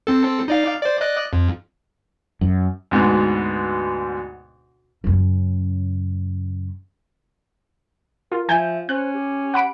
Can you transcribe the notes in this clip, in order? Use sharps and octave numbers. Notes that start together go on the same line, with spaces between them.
C4 A4
D#4 D5 F5
C5 D5
D5 D#5 F#6
F2
F#2
D2 G#2 B2
F#2 C#3
F4 A#4
F3 E5 G#5 G6
C#4 C5 F#6
G4
F#5 B5 D7